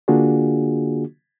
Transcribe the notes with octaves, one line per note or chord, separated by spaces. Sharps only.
D3 A#3 D4 F4 F#4 G#4